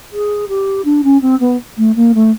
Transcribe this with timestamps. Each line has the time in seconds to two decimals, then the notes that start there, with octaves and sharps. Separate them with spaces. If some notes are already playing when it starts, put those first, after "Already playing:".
0.12 G#4
0.48 G4
0.85 D4
1.03 C#4
1.21 C4
1.40 B3
1.77 A3
1.95 A#3
2.14 A3